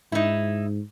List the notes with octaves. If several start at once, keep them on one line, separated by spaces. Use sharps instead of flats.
G#2 D#4 E4